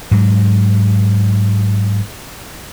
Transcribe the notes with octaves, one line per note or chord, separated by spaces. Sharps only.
G#2 F#3